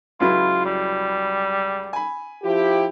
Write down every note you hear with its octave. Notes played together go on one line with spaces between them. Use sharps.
C#2 F#3 E4 F4
G3
G#5 B5
F3 E4 G4